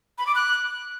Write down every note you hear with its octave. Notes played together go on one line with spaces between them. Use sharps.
B5
D6
F#6